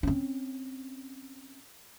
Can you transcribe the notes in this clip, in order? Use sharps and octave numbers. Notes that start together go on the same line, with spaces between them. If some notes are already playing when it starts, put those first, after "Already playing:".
C4 C#4